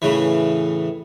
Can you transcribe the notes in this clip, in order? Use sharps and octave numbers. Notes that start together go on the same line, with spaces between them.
A2 C#3 E3